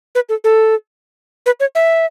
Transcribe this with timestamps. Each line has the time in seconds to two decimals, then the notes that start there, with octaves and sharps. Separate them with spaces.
0.15 B4
0.29 A4
0.44 A4
1.46 B4
1.60 C#5
1.75 E5